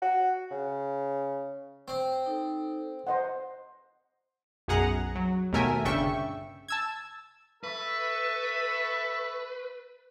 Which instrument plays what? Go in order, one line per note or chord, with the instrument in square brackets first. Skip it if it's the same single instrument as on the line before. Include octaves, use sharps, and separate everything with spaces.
[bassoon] F#4
C#3
[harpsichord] C4
[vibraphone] D#4 A4
[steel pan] C5 D#5 F#5 [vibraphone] C6
[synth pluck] B1 F#2 G#4 F#5 A#5
F#3
D#2 B2 A3 A#4 E5 G#5
G1 C#3 D4 E5 G5 C#6
A5 E6 G#6
[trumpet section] A4 E5 C#6 [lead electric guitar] B4